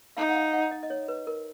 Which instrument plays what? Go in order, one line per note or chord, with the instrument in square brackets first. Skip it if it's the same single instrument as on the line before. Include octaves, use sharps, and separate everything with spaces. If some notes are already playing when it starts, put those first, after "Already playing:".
[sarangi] D#4 [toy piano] F5
[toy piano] F#5
F5
F#5
D#5
D#5
C#5
B4
A#4